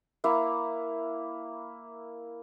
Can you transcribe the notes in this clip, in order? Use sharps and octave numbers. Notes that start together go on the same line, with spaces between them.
A#3 E4